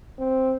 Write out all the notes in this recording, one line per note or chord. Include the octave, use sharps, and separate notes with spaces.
C4